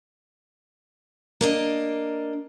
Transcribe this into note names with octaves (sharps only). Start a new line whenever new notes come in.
A#3 D4 D#5